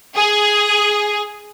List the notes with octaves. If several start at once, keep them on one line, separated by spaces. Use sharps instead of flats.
G#4